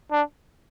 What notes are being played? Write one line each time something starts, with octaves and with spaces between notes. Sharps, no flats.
D4